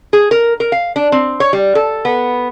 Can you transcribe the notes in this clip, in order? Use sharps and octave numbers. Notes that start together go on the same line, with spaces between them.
G#4
A#4
A#4
F5
D4
C4
C#5
G3
A4
B3